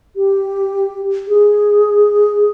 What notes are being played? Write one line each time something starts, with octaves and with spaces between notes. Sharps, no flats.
G4
G#4